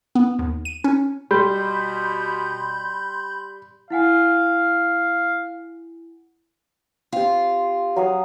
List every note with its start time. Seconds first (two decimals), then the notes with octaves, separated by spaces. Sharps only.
0.15 B3
0.39 D#2
0.65 D#7
0.84 C#4
1.31 B2 G3 B5 C6 G6
3.90 E4 F5 F#5 G#5
7.12 C4 F4 G4
7.96 F#3 F5 D#6